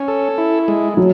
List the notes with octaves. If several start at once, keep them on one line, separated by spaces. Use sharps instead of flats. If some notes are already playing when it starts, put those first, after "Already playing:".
Already playing: C#4
A4
E4
G#3
F#3